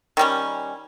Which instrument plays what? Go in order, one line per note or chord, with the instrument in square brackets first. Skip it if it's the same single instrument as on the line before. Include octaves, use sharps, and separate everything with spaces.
[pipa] D#3 G3 C#4